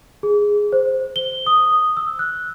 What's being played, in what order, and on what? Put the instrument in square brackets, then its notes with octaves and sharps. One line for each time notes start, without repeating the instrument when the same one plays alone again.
[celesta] G#4
C5
G7
D#6
E6
F#6